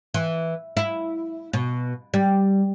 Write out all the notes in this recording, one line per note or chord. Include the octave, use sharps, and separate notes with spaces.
E3
E4
B2
G3